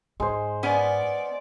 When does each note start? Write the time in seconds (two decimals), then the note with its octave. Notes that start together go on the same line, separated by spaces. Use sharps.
0.20 G#2 G#3 C5
0.63 B3 C#4 D5 G#5